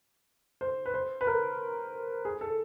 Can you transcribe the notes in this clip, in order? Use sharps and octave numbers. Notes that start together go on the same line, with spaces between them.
C5
B4
C5
B4
A#4
G#4
A4